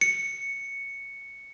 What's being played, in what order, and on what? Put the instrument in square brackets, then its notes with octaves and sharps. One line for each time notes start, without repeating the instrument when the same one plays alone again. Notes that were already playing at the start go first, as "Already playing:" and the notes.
[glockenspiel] C#7